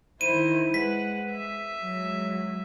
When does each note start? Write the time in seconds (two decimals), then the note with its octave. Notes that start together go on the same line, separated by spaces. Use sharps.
0.21 D#3 E4 C5 D#7
0.74 G#3 B4 F#5 B6
1.30 E5
1.82 F#3 G#3